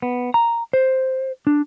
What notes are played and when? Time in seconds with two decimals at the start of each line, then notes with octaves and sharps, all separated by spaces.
0.02 B3
0.34 A#5
0.73 C5
1.47 D4